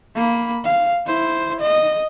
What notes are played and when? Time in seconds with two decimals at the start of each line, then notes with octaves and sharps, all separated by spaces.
0.15 A#3 B5
0.64 F5
1.07 E4 C5
1.60 D#5